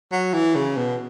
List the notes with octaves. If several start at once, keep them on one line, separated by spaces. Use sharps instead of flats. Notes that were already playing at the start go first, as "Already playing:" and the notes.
F#3
E3
C#3
B2